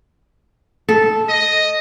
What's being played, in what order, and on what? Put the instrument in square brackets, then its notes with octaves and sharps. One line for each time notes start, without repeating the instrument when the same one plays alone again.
[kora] A4
[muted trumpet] D#5